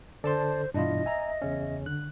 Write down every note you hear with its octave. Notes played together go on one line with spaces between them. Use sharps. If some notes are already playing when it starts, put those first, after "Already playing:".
D3 A4 C5 D5 A5 C6
G2 B2 E3 D4 E4 F4 D#5
E5 G#5 A#5
E2 C#3 C#4
D3 F#6